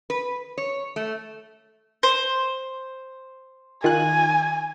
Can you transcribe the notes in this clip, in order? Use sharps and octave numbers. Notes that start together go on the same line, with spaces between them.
B4
C#5
A3
C5
D#3 F4 G#5 F#6